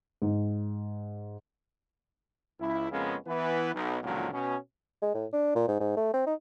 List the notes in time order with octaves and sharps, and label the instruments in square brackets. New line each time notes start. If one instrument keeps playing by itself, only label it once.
[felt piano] G#2
[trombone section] C#2 E4
F2 C#3 G#3 A#3 B3 C#4
E3 B3 B4
B1
C#2 A#2 D3 D#3 F3 F#3
B2 C#4
[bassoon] G#3
A2
D4
A#2
G#2
G#2
A3
C4
D#4